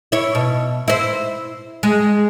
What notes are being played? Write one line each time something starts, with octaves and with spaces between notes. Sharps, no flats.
E4 C#5
B2
E4 C5
G#3